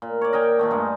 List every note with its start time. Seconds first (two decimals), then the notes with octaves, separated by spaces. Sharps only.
0.02 A#2
0.21 C#5 D5
0.33 A#4 D#5 G5 G#5
0.59 A#2 D#3 A3
0.71 G2 G#3